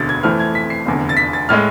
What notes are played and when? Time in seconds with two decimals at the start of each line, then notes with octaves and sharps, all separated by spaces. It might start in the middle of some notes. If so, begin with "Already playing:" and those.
Already playing: E1 D2 D3 A6
0.09 G#6
0.23 F2 E3 A3 C4 F6
0.39 G#6
0.55 B6
0.70 C7
0.86 F1 E2 D3
1.09 A6
1.17 B6
1.33 A6
1.49 A2 G#3 F6